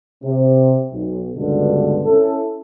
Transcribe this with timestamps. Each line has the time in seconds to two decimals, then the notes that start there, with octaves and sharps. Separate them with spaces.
0.23 C3
0.92 B1
1.35 C#2 G2 B2 D3
2.05 C#4 E4 A4